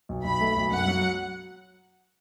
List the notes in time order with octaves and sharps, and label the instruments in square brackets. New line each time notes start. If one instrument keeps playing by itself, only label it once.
[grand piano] B1
[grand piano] B1 [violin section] B5
[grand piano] A3
B1
[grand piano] F#2 [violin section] F#5
[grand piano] F#3